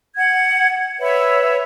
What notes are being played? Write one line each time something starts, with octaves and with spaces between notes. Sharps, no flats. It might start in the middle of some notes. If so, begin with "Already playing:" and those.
F#5 G#6
B4 C#5 E5